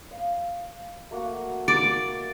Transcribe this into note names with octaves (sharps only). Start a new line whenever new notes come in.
D#5 F5
A3 A#3 F#4
D5